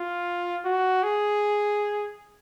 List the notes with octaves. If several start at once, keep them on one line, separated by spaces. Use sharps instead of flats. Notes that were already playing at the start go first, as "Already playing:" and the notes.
Already playing: F4
F#4
G#4